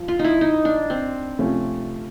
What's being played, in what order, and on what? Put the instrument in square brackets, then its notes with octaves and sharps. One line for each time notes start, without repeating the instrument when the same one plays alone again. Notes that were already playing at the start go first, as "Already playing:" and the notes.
Already playing: [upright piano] F3
[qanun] F4
D#4
E4
D#4
D4
C4
[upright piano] C3 F3 A3 C#4